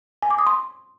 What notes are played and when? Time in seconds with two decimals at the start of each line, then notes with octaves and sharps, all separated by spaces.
0.22 G#5
0.30 D6
0.39 D#6
0.47 C6